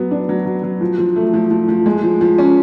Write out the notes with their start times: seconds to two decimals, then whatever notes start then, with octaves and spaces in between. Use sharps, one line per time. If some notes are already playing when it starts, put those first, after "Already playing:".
Already playing: F#3 B3
0.11 D4
0.29 F#3
0.46 F#3
0.63 F#3
0.81 F3
0.98 F3
1.16 A3
1.34 F3
1.51 F3
1.68 F3
1.86 G#3
2.03 F3
2.21 F3
2.38 C#4